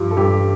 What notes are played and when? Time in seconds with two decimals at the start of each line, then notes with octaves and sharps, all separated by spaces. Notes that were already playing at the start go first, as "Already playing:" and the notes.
Already playing: G2 F3
0.11 A4
0.16 G2 G4